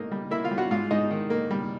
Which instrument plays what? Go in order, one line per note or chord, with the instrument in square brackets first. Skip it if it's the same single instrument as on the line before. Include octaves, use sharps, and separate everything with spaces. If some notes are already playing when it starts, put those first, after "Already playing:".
Already playing: [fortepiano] G#2 D#3 A3 A#3 D#4 D#5
G3
A#3 E4 E5
F4 F5
G3
F#4 F#5
G#2 F4 F5
G#2 D#4 D#5
D#3
A#3
G3